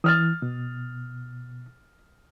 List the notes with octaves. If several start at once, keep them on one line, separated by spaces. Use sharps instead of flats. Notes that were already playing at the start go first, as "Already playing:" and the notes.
E3 D#6 F6 A6
B2